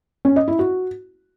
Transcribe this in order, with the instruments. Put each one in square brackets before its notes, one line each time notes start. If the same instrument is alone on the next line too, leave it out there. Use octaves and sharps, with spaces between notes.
[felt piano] C#4
D#5
E4
F#4